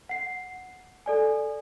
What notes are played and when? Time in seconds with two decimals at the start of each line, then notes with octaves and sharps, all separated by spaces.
0.09 F#5 C7
1.06 A4 D5 G#5